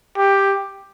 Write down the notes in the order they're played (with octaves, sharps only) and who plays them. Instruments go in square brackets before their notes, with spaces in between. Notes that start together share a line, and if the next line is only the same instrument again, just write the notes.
[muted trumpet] G4